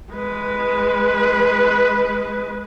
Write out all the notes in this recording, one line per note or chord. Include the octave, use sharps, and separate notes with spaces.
G#3 B4